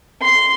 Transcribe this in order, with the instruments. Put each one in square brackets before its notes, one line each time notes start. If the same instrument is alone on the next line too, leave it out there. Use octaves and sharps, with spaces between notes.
[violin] C6